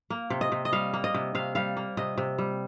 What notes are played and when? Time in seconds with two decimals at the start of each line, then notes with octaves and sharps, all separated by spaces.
0.10 A#3
0.30 C3
0.41 D#5
0.52 C3
0.65 D#5
0.72 G3 F5
0.93 A#3
1.04 D#5
1.14 C3
1.35 C3 F5
1.55 G3 F5
1.77 A#3
1.97 C3 D#5
2.18 C3
2.38 G3